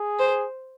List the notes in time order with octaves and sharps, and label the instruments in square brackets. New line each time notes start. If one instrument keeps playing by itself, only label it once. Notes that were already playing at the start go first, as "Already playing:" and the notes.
Already playing: [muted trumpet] G#4
[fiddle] C5